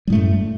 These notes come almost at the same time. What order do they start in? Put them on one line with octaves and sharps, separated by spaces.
G3 A2 A3 F#2